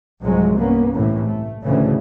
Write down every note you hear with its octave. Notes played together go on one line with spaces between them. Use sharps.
C2 G#2 C3 F3 F#3 G#3
G2 A#3 B3 C#4
A2 C3 E3
A3
D2 A2 C#3 E3 A3